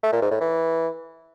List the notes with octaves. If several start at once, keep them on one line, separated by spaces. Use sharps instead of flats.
A3
A#2
G#2
A2
E3